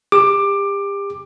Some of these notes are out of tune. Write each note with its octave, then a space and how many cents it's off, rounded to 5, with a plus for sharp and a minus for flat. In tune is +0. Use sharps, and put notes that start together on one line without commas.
G4 +35 D6 +15